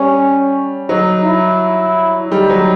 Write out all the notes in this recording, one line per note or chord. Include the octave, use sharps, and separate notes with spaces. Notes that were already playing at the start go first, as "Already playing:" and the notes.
Already playing: G3 C#4
F#3 D#4
E4
G3 D#4
F#3